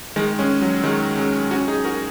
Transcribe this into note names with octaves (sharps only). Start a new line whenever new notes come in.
D#3 G#3
G#3 C#4
F#3
D#3 G#3
G#3 C#4
C#4 F#4
D#4 G#4
F#4 A#4